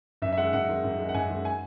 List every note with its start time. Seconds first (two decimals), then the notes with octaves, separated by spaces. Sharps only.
0.22 F#2 E5
0.32 E5
0.37 D#3 G#3 F#5
0.53 F#2 F#5
0.69 D#3 G#3
0.84 F#2
0.99 D#3 G#3
1.09 F#5
1.14 F#2 G#5
1.29 D#3 G#3
1.45 G#5